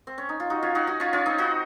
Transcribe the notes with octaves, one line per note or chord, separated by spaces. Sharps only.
C4
C#4
D#4
F4
D#4 F#4
C#4 F4
D#4 F#4
D#4 F#4
C#4 F4
C#4 F4
C4 D#4
D#4 F#4